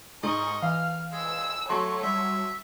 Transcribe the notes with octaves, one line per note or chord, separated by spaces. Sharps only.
G#2 D#5 C#6
E3 F5 F6
G#3 E6
F#3 A3 C#5 A5 C6 C#6
G3 E5